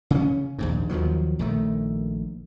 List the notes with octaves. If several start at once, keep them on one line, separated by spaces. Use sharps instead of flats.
C#3 C4 C#4
A#1 D#2 G#2
D#2 D#3 F3 F#3
A#1 D#3 A3